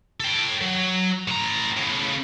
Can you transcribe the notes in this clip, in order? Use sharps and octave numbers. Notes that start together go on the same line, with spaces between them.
A4 G5
F#3
A2 A#5
A2 C#3